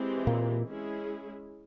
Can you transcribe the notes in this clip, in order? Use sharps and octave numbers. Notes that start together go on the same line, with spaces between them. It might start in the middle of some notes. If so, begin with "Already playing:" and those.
Already playing: E3 G#3 C4 G4
A#2 A#3
G#3 C#4 E4 G#4